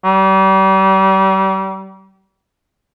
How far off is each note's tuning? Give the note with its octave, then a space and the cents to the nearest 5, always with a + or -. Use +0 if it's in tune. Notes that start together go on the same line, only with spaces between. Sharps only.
G3 -35